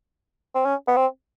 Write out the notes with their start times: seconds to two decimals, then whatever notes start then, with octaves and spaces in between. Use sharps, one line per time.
0.55 C4
0.65 C#4
0.88 B3
0.97 C4